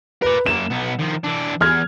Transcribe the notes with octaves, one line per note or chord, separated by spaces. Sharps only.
A#4 B4 D5
F#2 A#3 E7
B1 B3
D#3 F3
E3 D4
E2 F6 G#6